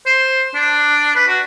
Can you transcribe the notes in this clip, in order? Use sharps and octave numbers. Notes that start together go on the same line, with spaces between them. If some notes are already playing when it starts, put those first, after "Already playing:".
C5
D4
B4
F#4